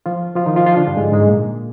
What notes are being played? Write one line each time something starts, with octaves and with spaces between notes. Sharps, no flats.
F3 F4
F3 F4
D#3 D#4
F3 F4
F3 F4
D3 D4
G2 G3
G#2 G#3
G#2 G#3
A#2 A#3